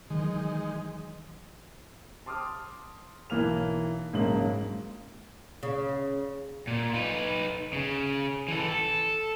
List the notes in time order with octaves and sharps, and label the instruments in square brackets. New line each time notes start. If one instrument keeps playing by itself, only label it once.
[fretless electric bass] D#3 E3 F#3 [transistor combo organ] G#3 D#4
[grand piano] A5 C6 D6 D#6 F6
B1 E3 A#3 F6 F7
A#1 G#2 C#3 F#3 A#3 F#7
[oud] C#3
[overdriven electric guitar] A#2
D#4 B4
C#3
E3 A4
A4